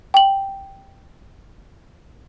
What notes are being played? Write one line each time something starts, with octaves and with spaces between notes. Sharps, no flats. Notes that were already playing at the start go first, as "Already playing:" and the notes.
G5 F#7